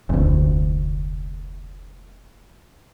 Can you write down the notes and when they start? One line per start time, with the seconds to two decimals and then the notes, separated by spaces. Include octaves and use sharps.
0.10 F1 D2